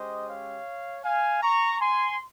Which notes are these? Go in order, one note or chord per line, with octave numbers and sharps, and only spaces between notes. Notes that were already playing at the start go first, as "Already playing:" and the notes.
Already playing: G#3 C#4 G4 C5 D#5
C#5 F5
F5 G#5
A#5 C#6
G#5 C6